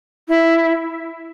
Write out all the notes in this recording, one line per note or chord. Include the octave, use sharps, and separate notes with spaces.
E4